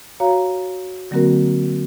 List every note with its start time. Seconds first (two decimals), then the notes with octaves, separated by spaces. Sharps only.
0.20 F#4 C#5 F5 A#5
1.11 D3 F#3 A#3 C4 F#4 A#4